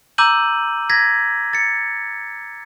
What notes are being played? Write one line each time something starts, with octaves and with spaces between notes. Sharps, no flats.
A#5 D6 E6 G6 D#7 F#7
G#6 A#6 B6
A6 C#7